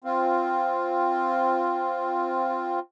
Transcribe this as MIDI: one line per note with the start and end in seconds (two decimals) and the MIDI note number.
0.04 2.79 60
0.04 2.79 65